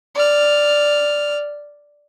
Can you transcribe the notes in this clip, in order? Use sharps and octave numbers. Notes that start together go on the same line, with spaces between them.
D5 F6